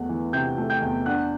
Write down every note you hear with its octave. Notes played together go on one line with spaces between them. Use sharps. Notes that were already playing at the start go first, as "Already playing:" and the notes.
Already playing: E2 A3 F#5
E3
C3 G5 G6
A3
G5 G6
E2
D4 F#5 F#6